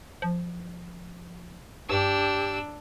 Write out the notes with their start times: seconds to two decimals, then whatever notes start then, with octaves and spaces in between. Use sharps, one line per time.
0.22 F3
1.89 G2 D4 G4 E6